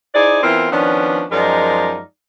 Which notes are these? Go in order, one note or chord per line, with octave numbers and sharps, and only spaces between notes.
D#4 E4 G#4 C5 D5
E3 B3 C4 E4 F4 A#4
D#3 F3 B3 C#4 D4
F#2 F3 G#3 D#4 A#4 D5